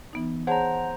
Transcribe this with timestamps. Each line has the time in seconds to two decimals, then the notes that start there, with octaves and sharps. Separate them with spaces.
0.13 E3 B3 D#4
0.47 G#4 C5 C#5 F#5 A5 A#5